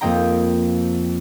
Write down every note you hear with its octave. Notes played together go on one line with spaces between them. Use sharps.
F2 A#3 C4 D#5 G5 A#5